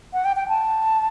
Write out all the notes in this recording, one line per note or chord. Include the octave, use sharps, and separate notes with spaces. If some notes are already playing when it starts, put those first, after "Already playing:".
F#5
G5
G5
A5